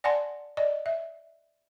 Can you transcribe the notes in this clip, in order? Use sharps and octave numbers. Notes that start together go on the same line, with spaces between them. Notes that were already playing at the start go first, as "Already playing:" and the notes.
D5 F#5 G#5 A5 C6
D5 D#5
E5